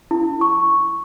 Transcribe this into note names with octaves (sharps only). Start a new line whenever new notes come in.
E4
C#6